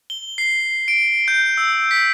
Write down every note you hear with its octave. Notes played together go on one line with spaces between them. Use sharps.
G7
C7
D7
G6
E6
B6